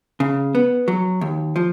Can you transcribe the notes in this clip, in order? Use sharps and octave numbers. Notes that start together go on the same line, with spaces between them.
C#3
B3
F#3
D#2
F3